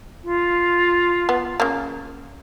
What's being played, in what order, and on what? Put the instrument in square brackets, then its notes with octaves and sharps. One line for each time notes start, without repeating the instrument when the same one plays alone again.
[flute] F4
[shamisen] B3
C#3 A#3